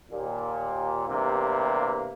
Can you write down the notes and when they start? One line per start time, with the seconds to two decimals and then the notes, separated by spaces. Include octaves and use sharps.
0.11 D#2 A#2
1.08 E2 G2 C3 A#3